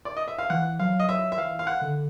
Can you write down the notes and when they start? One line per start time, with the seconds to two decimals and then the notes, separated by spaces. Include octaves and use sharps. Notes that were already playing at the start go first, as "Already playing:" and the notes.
0.05 D5
0.17 D#5
0.28 E5
0.39 F5
0.50 E3 F#5
0.80 F#3 F5
1.00 D#5
1.08 F#3 E5
1.32 E5
1.38 E3 F5
1.59 F5
1.67 F#5
1.81 D3